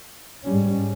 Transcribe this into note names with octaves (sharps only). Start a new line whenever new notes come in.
G#2 G3 C#4